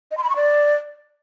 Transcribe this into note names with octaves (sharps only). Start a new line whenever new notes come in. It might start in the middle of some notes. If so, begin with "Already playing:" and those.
D#5
C6
B5
C#6
D5